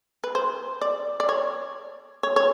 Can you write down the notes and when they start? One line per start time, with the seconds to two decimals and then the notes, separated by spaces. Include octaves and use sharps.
0.24 B4
0.35 C5
0.81 D5
1.20 D5
1.29 C#5
2.23 C#5
2.36 C#5